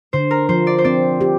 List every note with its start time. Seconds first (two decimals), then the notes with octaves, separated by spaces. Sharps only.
0.13 D3 C5
0.31 A#4
0.49 F3 C5
0.67 D5
0.78 C5
0.84 C4 D5
1.21 G4